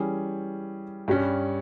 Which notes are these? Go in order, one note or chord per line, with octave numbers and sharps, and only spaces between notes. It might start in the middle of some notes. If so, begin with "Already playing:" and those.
Already playing: E3 G3 C#4 G#4
G2 G3 C#4